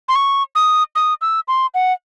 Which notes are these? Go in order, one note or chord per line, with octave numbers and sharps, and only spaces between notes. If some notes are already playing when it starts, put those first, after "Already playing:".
C6
C#6
D#6
D#6
E6
C6
F#5